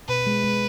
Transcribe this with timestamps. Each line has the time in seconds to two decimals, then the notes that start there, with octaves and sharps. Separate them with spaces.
0.08 B2 B4
0.27 G#3
0.43 G#3